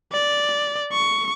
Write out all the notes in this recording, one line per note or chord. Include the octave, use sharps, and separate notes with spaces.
D5
C#6